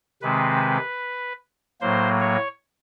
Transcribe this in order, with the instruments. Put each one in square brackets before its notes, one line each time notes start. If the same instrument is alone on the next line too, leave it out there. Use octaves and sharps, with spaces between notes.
[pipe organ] C3 D#3 G#3 C4 B4
A2 F#3 A#3 C5
C#5